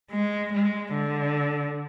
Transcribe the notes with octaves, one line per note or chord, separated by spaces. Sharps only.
G#3
G#3
D3